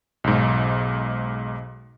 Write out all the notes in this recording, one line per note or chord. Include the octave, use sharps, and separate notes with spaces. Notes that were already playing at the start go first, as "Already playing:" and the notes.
B1 G#2